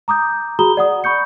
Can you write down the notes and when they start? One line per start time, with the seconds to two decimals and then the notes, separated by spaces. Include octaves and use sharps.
0.08 A#5 D6 D#6 G6
0.59 F#4 G#4 A#5 B5 D#6 G7
0.77 D5 F#5 D#6
1.04 B5 C#6 G6 C#7